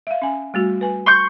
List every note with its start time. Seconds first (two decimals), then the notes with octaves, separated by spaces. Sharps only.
0.07 E5 F5
0.22 C#4 G#5
0.54 G3 A3 F#4
0.81 B4 G#5
1.06 C6 C#6 G6